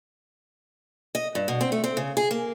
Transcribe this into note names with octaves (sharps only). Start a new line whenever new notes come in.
D#5
G2
B2
C4
A3
C4
C#3
G#4
A#3